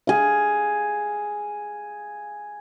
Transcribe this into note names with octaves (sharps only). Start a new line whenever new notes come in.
G#4 F5